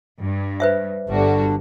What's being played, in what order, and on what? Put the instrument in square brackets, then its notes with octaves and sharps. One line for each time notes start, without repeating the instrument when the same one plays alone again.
[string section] G2
[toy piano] B4 C5 E5
[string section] G1 G3 F#4 [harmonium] D3 D4